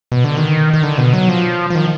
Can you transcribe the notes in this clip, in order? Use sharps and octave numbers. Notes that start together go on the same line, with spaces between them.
B2
D3
D#3
D#3
D3
B2
F#3
F3
F3
D#3